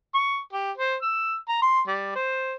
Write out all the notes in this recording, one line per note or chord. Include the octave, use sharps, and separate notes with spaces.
C#6
G4
C5
E6
A#5
C6
G3
C5